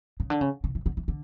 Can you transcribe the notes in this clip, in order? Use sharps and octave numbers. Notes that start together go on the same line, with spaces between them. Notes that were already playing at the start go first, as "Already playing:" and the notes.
C#3
D3
C#3
C#3
E3
D3
E3
D3